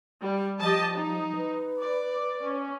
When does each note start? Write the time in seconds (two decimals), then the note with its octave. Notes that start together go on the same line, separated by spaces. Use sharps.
0.20 G3
0.60 F3 G4 D#5 A5
0.94 D#4
1.36 B4
1.80 D5
2.43 C#4